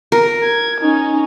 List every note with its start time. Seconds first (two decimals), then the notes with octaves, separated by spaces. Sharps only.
0.12 A#4
0.43 G#6
0.81 C#4 D#4